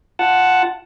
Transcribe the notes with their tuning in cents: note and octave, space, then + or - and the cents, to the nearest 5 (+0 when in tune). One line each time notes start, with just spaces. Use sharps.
F4 +0 F#5 +0 A5 +0